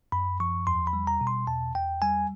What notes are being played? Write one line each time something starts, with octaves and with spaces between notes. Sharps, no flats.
F#2 B5
F3 C#6
E2 C6
B5
G3
A#5
B2
C6
E2 A5
E2 G5
G3 G#5